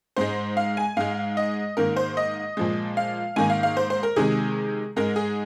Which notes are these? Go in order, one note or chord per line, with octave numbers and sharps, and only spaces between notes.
G#2 G#3 C5
F5
G#5
G#2 G#3 F5
D#5
G#2 D#3 A#3 A#4
C5
D#5
A#2 F3 G#3
F5
G#2 D#3 A#3 G#5
F5
F5
C5
C5
A#4
C3 D#3 G#3 G#4
G#2 G#3 A#4
G#4